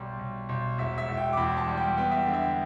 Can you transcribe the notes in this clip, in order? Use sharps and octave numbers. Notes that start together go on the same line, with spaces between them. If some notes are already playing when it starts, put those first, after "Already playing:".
Already playing: B1 G3
B1
B1
E1 E5
E5
E1
G5
D6
E2 B5
A5
G3
G5
B3 G5
E5
D3
E5
G5